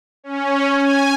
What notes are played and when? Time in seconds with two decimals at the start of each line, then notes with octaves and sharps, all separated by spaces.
0.24 C#4
0.75 G#5